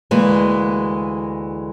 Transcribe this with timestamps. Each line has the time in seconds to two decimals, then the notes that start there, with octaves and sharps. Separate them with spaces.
0.11 D2 E3 G#3 A#3